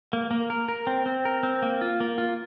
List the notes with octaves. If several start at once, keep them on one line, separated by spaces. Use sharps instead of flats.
A#3
A#3
A#4
A#4
C4
C4
A#4
C4
A#3
F4
A#3
F4